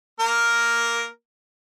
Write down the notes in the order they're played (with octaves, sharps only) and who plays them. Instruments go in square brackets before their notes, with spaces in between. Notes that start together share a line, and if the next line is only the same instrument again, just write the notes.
[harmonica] A#3 A#4